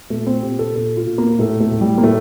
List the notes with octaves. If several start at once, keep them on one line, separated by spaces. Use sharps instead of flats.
A#2 A3
C4
A#2 G4
A4
A#2 A4
F4
A#2
A#3
A2 A3
A3
A2
G3
A#3
A2 A3